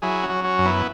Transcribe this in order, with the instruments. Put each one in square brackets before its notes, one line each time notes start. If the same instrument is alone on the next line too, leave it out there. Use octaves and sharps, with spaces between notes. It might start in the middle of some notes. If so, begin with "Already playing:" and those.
[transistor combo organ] F#3 E4 G#4
C#4 F#4
F#3
C#4 F#4
F#2
B3 E4